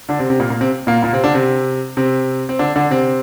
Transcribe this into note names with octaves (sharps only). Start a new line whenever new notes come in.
D3 D4
C3 C4
C3 C4
A#2 A#3
A#2 A#3
C3 C4
A#2 A#3
A#2 A#3
C3 C4
D3 D4
C3 C4
C3 C4
C4
D3 D4
D3 D4
C3 C4